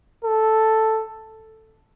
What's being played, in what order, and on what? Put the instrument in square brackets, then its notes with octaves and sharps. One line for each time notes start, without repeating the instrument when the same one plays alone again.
[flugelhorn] A4